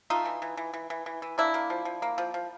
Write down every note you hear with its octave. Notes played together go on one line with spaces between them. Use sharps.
A3 D#4 F4
E3
E3
E3
E3
E3
E3
E3
A#3 D4 E4
A#3
F3
F3
A#3
F3
F3